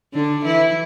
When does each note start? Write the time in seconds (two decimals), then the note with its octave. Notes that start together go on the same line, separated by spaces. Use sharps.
0.14 D3 D4
0.45 E3 E4